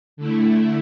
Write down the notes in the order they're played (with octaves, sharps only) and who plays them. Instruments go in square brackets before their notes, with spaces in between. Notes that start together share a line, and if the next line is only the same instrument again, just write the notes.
[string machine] D3 A3 E4